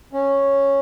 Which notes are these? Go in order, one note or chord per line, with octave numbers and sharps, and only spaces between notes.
C#4